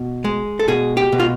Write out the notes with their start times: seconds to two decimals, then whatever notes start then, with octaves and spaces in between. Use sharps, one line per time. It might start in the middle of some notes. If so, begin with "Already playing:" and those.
Already playing: B2
0.24 G#3
0.59 A4
0.68 B2 G#4
0.97 G4
1.12 B2
1.20 F4